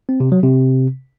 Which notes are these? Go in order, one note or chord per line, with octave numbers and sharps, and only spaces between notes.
C4
C3
F#3
C3